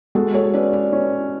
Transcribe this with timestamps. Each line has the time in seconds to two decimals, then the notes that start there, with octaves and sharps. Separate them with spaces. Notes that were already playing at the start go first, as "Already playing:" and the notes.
0.15 G#3 F#4 A4
0.34 A4 C#5
0.54 C#4 B4 D5
0.73 B4 D5
0.93 C#4